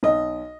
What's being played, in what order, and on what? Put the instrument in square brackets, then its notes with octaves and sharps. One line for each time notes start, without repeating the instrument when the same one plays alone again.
[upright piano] B1 D#5